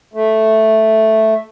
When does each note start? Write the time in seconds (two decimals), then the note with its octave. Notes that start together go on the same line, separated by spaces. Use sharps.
0.14 A3